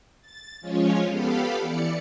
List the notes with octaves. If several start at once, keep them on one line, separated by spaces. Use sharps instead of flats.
A6
F3 G#3 C#4 F4 C#5
B3 G4 A4 F5 B5
E3 D5 C#7